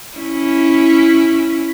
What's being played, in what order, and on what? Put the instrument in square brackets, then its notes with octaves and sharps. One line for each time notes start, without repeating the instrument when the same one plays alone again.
[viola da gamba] C#4 E4